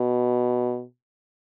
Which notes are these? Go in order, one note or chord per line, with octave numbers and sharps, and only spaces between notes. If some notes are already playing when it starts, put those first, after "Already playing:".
Already playing: B2